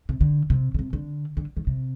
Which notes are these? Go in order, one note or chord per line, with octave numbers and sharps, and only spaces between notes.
C3
D3
C3
D3
C3
D3
D3
D#3
C3